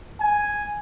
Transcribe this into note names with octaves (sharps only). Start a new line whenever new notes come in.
G#5